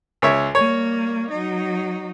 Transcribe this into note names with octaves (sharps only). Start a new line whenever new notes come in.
C#2 C#5 E5
G3 A#3 C#5
F#3 D#4